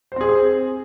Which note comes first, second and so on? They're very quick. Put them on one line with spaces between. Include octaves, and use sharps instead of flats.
C5 C4 G#4